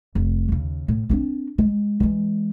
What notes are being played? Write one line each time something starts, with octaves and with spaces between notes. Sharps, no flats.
F1
D#2 C#3
A2
C4 D4
G#3
E3 G#3